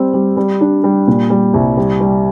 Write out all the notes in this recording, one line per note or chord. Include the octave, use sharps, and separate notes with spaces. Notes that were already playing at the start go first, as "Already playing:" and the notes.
Already playing: G3 C4
G3
G3
D4
G3
A#2
G3
C2
G3
G3